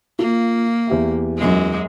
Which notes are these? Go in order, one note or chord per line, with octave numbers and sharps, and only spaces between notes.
A#3 F4
E2 G4 E5
F#2 G#3